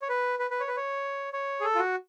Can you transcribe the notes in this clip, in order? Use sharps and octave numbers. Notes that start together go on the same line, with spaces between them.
C#5
B4
B4
B4
C#5
B4
C#5
C#5
G#4
A4
F4
F#4